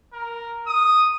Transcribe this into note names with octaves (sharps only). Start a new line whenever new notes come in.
A#4
D#6